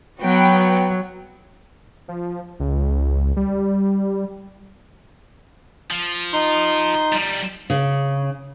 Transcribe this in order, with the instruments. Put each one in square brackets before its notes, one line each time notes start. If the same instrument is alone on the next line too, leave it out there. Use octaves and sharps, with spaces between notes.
[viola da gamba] F#3 [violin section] B3 F#4 G5
[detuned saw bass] F3
C#2
G3
[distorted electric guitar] F3
[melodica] D#4 C6
[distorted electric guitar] F3 G3
[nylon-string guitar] C#3